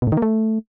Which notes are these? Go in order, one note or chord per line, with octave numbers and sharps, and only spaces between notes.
B2
A2
D#3
A#3
A3